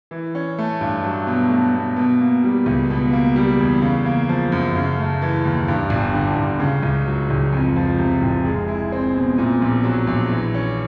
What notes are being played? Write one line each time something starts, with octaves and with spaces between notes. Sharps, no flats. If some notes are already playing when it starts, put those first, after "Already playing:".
E3
C#4
A3
G2
F#3
B2
A3
B2
B2
A#3
G3
C#2
B2
A#3
G3
E2
C#3
A#3
F3
F#2
C#3
A3
E3
D#2
G2
G1
D3
G1
C#3
C#2
F#3
C#2
F2
F3
C3
F1
G#3
E4
C4
B2
A#2
A#1
F#3
A#1
E3
C#4